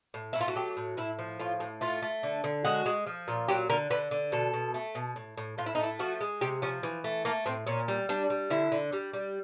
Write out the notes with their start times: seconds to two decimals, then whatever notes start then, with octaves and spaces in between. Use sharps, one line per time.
0.14 A2
0.33 A3 E4
0.41 F4
0.48 F#4
0.55 F#3 G4
0.77 A2
0.97 A2 E4
1.19 F3
1.39 A2 F4
1.60 A2
1.81 A3 F4
2.02 A3
2.23 D3
2.44 D3
2.65 G#3 F#4
2.86 G#3
3.07 F3
3.28 A#2
3.48 F#3 G4
3.70 D3 A#4
3.90 D3 B4
4.11 D3
4.32 B2 A4
4.53 B2
4.74 A3
4.95 B2
5.16 A2
5.37 A2
5.58 A2 F4
5.66 E4
5.75 D#4
5.79 A3 E4
5.99 F3 F#4
6.21 G#3
6.41 C3 G4
6.62 F3 C#4
6.83 E3
7.04 A3
7.25 A3 A#3
7.46 A2 C4
7.67 A#2 C#4
7.88 G3
8.09 G3 D4
8.30 G3
8.50 D3 E4
8.72 D3
8.92 G3
9.13 G3